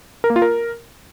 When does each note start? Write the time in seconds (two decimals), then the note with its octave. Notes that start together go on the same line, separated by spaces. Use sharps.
0.24 A#4
0.30 A#3
0.36 F4
0.42 A#4